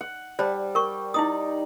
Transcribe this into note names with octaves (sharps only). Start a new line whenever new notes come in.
F#5
G3 C5 D5 A5
A#4 G5 C#6
D#4 E4 D5 D#6